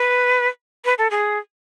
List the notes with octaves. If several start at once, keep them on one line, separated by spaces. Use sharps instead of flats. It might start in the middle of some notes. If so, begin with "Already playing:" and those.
Already playing: B4
B4
A4
G#4